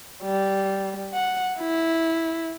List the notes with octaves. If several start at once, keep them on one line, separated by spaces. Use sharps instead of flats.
G3
F#5
E4